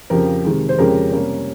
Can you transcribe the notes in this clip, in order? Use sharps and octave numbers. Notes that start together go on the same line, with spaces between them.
F2 C#3 F3 G4 A#4
C3 D#3 G#3
C5
F2 C#3 G#3 C#4 G4 A#4
C3 G3 A#3 C#4